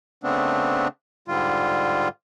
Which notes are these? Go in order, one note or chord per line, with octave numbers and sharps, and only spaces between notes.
C#3 A3 B3 C4 D4
G#2 D3 G3 F4